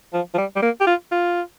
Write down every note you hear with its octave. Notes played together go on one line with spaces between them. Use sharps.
F3
F3
G3
G3
A#3
G4
F4
F4